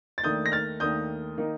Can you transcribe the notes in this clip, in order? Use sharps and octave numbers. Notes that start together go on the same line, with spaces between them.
A6
D#2 D#3 A3 D4 D#6 G6
A#6
F6 A6
D#2 D#3 A3 D4 D#6 G6
D#3 A#3 D#4